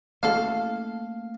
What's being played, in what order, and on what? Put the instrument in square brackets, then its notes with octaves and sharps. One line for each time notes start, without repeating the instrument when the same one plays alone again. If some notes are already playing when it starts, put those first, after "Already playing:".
[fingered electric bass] A3 A#3 C#4 [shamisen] E4 F#4 A4 [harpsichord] F5